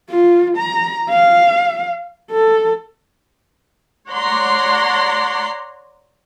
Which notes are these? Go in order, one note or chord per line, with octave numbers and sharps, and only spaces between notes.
F4
A#5
F5
A4
C#5 D5 F#5 A#5 C6